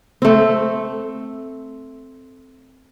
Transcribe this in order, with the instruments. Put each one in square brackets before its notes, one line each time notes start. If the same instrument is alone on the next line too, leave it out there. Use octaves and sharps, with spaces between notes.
[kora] A3 C4